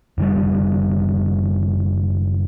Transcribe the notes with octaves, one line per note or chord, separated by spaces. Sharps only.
F#1 D#3 G3